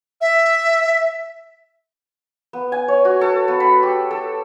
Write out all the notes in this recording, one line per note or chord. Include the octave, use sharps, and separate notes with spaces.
E5
B3
G#5
C#5
F#4
A4
B3
B5
G4
A4